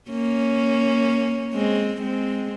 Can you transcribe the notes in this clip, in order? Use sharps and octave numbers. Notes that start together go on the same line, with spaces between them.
A#3 C#4
G#3 C4
G#3 C4